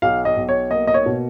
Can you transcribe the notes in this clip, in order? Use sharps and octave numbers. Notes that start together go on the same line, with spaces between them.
B1 F5
D#5
B1
C#5
A#3 D#5
D#5
C#5
B2